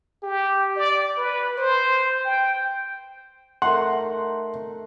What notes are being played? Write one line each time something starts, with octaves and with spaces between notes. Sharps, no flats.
G4
D5
B4
C5
G5
A3 D#4 A#4 F#5 C6